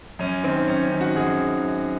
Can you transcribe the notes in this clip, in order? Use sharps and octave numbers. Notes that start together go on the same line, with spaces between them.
F#2 C#4
D#3 C4
F#2 C#4
C#4
D#3
F#4
F#2 G#4
D#3
F#2